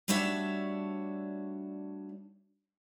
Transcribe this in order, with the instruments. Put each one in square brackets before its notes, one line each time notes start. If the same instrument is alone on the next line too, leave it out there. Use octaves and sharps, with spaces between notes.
[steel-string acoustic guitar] G3 A3 D4 F#4 C#5 E5